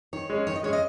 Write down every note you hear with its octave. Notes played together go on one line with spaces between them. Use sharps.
D#3 C#5
G#3 C#4
D#3 C#5
D#5
G#3 C#4 C#5
D#5